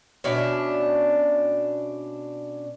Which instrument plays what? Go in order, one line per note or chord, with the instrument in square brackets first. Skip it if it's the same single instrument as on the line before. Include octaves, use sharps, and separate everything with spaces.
[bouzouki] B2 C#4 D4 E5